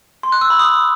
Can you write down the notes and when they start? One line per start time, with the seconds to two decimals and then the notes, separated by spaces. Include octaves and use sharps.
0.23 C6
0.32 F#6
0.41 E6
0.50 B5
0.59 D#6